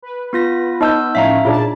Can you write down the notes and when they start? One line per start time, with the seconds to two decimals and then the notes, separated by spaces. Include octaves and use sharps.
0.02 B4
0.33 B3 F4 A#6
0.81 B3 D#4 D#5 A5 E6 G6
1.15 A2 F3 C#4 E5 F5 A#5
1.45 A#2 D4 F4 G#4 D5 A5